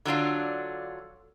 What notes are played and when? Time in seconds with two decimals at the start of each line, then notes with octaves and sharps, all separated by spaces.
0.05 D3 F#3 D4 F4